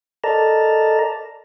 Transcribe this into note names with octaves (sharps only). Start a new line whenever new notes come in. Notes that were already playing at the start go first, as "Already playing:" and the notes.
A4 A#4 D5 D#5 A5 A#5